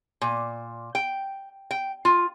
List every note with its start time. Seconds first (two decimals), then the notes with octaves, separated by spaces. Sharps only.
0.22 A#2
0.95 G5
1.71 G5
2.05 F4